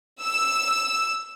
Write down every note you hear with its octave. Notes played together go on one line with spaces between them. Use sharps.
E6